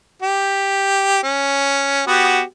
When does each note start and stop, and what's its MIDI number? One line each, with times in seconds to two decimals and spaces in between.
0.22 1.21 67
1.23 2.07 61
2.07 2.42 59
2.07 2.42 66
2.07 2.42 67